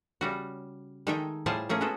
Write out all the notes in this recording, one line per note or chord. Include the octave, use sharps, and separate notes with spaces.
C#3 G3 F#4
D#3 G#3 D#4 A4 E5 G5
A2 G3 F4 G#4 C5 A5
A3 A#3 C#4 G#4
G#3 B3 F4 F#4 A4